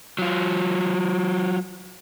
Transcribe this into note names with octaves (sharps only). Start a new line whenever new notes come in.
F#3 F4